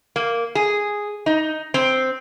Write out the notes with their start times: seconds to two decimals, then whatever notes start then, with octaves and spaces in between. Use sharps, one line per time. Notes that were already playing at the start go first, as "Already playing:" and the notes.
0.16 A#3
0.55 G#4
1.26 D#4
1.74 C4